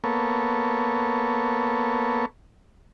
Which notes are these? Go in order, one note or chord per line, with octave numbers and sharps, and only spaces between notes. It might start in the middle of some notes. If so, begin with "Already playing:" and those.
A#3 B3 A4 C#5